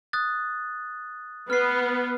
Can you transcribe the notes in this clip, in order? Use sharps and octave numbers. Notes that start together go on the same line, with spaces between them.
D#6 F#6 A6
B3 F6 C7